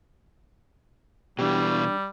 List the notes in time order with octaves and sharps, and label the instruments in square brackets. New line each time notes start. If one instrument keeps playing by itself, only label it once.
[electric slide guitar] B2 E3 [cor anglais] G3 [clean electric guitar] D4 G4